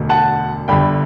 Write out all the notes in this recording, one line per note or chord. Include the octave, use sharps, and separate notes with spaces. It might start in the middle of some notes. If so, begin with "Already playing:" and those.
Already playing: E1 D2 D3
F#5 A5
G1 G2 D3 G5 B5